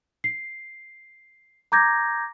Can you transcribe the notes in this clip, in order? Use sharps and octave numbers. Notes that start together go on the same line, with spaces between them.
C7
A#5 D6 G6 G#6 A#6